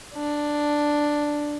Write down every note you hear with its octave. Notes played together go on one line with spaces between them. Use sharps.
D4